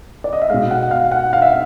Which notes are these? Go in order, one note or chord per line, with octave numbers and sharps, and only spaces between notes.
D5
D#5
E5
B2 G#3 F5
F#5
F5
F#5
F5
E5